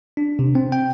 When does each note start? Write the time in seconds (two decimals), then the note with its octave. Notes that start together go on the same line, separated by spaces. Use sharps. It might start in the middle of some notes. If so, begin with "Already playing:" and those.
0.17 D4
0.39 C3
0.55 C4
0.72 G5